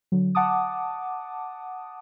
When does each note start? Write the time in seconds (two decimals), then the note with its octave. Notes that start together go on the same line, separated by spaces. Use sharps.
0.12 D3 F#3
0.35 F#5 A5 D6 D#6